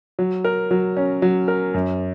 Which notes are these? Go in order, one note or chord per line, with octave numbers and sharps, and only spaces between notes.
F#3
A#4
F#3
C#4
F#3
A#4
F#2